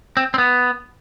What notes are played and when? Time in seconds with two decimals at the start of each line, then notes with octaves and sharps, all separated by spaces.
0.17 C4
0.34 C4
0.38 B3